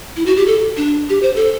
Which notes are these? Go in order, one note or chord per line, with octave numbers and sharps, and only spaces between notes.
E4
F#4
G4
A4
D4
G4
C5
A4